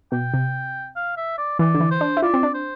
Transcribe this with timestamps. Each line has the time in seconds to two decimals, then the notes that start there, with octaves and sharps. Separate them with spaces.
0.12 B2 G5
0.34 C3
0.96 F5
1.17 E5
1.38 D5
1.59 E3 D5
1.74 D3
1.80 E3
1.91 C5
2.01 D4
2.17 E4
2.22 F4 D5
2.34 C4
2.43 D4
2.54 C5